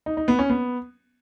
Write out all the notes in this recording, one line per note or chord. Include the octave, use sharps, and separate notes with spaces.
D#4
D#4
B3
C#4
B3